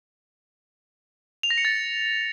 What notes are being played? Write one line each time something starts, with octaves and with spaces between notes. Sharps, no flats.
F7
A#6
C#7
A6